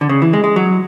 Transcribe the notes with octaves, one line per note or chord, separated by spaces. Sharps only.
D3
C#3
E3
G#3
G#3
F#3